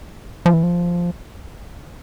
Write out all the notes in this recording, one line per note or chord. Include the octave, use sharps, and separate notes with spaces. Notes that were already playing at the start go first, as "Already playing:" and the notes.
F3
E3
F3